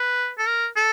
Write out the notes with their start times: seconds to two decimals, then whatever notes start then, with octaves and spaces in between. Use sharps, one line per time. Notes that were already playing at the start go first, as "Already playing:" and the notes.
Already playing: B4
0.38 A4
0.47 A#4
0.76 A4